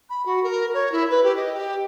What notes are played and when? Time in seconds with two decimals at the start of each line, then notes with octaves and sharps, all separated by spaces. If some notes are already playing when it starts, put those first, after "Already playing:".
0.09 B5
0.25 F#4
0.43 A#4
0.73 C#5
0.91 E4
1.10 B4
1.23 G4
1.36 D#5
1.53 G4